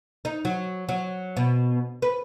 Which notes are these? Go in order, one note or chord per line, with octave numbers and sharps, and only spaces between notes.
D#4
F#3
F#3
B2
B4